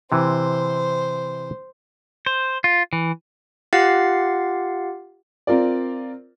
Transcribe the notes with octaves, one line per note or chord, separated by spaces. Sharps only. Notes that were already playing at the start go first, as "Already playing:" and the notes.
C3 E3 C5
C5
F4
E3
F4 G4 F5 F#5 A6 C7
C4 F4 A#4 D5